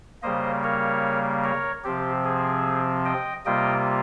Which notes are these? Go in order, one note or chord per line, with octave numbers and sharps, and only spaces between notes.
C#3 G3 A#3 C5 D#5
A#4 C#5
A#4 C#5
C3 F3 C4 G4
G#4
D#5 G5
C3 G3 A#3 F4 D#5 G5